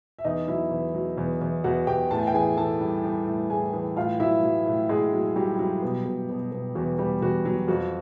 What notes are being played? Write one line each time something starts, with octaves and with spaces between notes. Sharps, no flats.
E5
E2 D#4 D#5
F#3 E4 E5
E2
F#3
E2
E2
E2 F#4 F#5
E2 G4 G5
A2 A5
G#5
G5
E3 G#4 G#5
E3 A4 A5
G3
G3
A2
A2 G#4 G#5
E3
A2 F4 F5
F#3 E4 E5
F#3
A2
A2 G#3 G#4
F#3
F#3 G3 G4
F#3
B2
B2
B2
B2
E2 F#4
E2 G3 G4
E2 F#4
F#3
F2 F#4